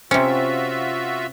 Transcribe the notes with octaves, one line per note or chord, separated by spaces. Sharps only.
C3 C4 C#4 F4 F#4 E5